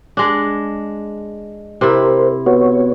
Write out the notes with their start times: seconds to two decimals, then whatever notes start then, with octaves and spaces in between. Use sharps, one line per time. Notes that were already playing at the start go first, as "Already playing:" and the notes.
0.17 G#3 D4
1.81 C3 E4 A#4 C5
2.46 B3 F#4 C#5